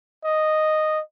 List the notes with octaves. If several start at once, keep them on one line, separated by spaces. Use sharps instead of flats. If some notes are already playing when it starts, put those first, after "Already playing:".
D#5